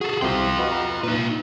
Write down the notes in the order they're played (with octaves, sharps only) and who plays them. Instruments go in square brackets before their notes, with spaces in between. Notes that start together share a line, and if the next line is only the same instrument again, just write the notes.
[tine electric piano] F#4 [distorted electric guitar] G#4 A4
[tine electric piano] C2 C3 C6 [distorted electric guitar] F4 G5
[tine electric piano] F#4 B4 D#5
A#5
[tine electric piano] A#2 [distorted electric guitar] D#4 B4